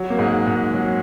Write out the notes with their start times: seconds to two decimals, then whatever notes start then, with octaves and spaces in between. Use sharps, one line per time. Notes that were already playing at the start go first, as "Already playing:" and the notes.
Already playing: F#3
0.10 A#3
0.19 G#2 G#3
0.46 G#2 G#3
0.74 F#3